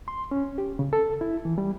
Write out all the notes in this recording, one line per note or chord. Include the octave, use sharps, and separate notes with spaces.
C6
C#4
G4
C#3
A4
E4
E3
G3